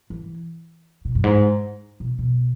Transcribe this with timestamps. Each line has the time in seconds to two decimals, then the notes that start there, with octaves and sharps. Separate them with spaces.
0.10 E3
1.05 B2
1.15 F#2
1.24 G#2
2.00 B2
2.19 B2